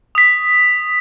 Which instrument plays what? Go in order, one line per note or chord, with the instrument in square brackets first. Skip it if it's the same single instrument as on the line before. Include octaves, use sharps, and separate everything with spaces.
[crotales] D#6 B6